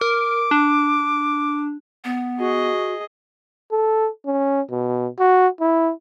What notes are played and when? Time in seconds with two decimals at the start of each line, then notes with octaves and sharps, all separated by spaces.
0.01 A#4 D6
0.51 D4
2.04 B3
2.39 F#4 G#4 D#5
3.71 A4
4.26 C#4
4.71 B2
5.19 F#4
5.61 E4